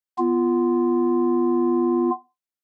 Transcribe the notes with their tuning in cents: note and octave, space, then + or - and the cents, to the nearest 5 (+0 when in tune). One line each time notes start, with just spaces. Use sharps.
B3 +0 F4 -15